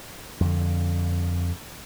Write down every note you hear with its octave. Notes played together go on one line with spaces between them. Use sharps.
F2 D3